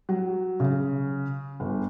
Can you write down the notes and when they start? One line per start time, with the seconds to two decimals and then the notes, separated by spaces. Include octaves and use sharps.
0.09 F#3
0.60 C#3
1.60 G1